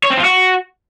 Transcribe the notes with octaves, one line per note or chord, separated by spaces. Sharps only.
C#5
C4
F4
F#4